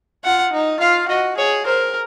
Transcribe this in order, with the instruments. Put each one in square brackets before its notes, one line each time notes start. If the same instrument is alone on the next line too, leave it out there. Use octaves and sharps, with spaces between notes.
[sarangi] F4 [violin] F#5
[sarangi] D#4
[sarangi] F4 [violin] F5
[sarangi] F#4 [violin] D#5
[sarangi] G#4 [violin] C#5
[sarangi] A#4 [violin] C5